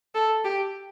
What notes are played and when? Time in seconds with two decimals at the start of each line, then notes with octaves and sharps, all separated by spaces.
0.15 A4
0.45 G4